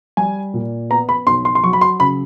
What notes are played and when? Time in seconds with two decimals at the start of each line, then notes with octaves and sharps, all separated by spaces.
0.17 G3 G#5
0.54 A#2
0.90 B3 A#5
1.09 B5
1.27 B1 C6
1.45 C6
1.55 C6
1.63 F#3 C#6
1.73 B5
1.81 C6
2.00 C#3 B5